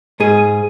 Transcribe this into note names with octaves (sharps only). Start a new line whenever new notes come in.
G#2 G#4